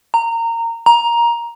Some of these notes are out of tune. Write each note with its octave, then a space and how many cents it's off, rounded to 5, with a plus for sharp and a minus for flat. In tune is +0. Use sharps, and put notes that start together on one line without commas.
A#5 -20
A#5 +10